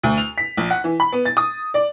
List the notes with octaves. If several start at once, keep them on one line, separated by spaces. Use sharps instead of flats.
D2
F7
B6
A#1
F#5
E3
B5
B3
A6
D#6
D5